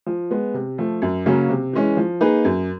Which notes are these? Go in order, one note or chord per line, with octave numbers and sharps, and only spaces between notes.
F3
G#3 B3
C3
F3 A3
F#2
C#3 F#3 A#3 C#4
C3
E3 G#3 C#4
F3
A#3 D#4 G#4 B4
F#2